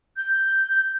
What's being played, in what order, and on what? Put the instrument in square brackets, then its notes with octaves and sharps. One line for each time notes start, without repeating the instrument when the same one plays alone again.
[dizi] G6